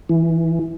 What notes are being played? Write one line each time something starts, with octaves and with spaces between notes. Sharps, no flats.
E3